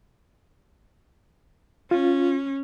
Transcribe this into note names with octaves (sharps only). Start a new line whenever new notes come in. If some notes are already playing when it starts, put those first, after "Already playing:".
C#4 F4